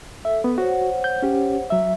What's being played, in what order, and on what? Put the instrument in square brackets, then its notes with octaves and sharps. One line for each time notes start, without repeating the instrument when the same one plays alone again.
[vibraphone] A4 [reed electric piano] E5
[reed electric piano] B3
[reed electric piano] F#4 [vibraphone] C5 C#5 F#5
[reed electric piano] G6
C#4 G4
F#3 E5